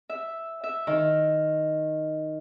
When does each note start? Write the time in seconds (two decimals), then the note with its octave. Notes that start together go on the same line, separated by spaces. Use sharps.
0.09 E5
0.64 E5
0.87 D#3